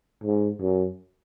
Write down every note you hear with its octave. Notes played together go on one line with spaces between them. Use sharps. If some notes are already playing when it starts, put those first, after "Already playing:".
G#2
F#2